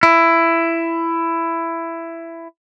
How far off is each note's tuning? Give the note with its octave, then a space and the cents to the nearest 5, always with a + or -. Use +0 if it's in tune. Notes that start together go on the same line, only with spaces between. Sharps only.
E4 +15